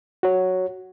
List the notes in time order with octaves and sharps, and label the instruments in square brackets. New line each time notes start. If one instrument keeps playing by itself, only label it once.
[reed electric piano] F#4 C#5